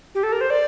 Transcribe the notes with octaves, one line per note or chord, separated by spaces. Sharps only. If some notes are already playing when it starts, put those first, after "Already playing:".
G4
A4
A#4
C5
D5